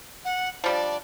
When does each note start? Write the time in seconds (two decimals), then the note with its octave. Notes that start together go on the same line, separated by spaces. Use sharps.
0.25 F#5
0.64 F3 G3 D4 D5